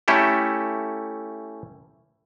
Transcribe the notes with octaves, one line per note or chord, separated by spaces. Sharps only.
A3 C#4 E4 G4 A4